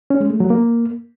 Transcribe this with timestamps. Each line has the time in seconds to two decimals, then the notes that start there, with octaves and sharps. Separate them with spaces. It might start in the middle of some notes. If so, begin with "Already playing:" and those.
0.10 C#4
0.20 G#3
0.30 A3
0.40 F#3
0.50 A#3